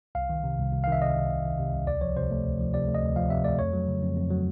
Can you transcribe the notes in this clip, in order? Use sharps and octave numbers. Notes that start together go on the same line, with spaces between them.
C2 F5
D#3
C3
C2
C2
D#3 F5
E5
C3 D#5
C2
C2
D#3
C3
C2
D2 D5
F3 C#5
C3 C5
A3
D2
F3
C3 D5
A3
D#5
D2
F3 F5
C3 E5
A3 D5
F2 C#5
F#3
C#3
F2
F2
F#3